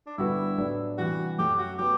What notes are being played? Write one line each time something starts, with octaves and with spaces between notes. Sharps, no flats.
D4
G2 D3 G3 B3 E4 F#4
A2 F#3 B3 D4
C3 E3 G3 F#4
F#2 F#3 A3 G4
F#4
F#3 B3 G4